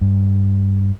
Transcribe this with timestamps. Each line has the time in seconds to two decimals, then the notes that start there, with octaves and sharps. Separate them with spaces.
0.01 G2